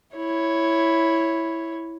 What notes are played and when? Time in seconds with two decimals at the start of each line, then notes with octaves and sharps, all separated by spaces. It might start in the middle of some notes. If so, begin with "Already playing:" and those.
0.16 E4 C#5